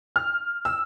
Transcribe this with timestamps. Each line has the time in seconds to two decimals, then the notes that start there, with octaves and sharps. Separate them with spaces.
0.16 F6
0.65 E6